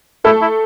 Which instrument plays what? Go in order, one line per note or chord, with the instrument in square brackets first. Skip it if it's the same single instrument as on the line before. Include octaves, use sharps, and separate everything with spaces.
[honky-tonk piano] A3 A4 [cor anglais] E4
[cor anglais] E4